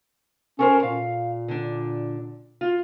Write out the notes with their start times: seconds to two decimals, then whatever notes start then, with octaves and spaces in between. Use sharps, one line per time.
0.59 C#4 A4 A#4 C5
0.83 A#2 F5
1.48 D3 D4
2.61 F4